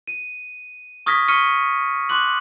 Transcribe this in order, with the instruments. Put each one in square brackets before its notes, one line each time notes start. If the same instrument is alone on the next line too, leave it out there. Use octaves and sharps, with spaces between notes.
[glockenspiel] D#7
C#6 D#6 F6 G#6 A#6 B6
C#6 F6 B6 C#7 D#7
C6 D6 F#6 F#7